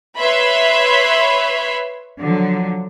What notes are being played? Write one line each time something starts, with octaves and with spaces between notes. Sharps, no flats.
B4 C#5 E5 B5 C6
D3 F3 F#3